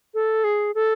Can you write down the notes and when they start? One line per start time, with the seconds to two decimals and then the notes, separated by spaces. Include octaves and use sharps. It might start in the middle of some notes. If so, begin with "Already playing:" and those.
0.14 A4
0.44 G#4
0.75 A4